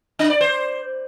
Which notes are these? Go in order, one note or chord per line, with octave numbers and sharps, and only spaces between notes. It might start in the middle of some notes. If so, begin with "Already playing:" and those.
D4
D5
C5